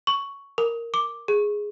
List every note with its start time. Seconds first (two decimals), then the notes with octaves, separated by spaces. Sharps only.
0.07 C#6
0.58 A#4
0.94 D6
1.28 G#4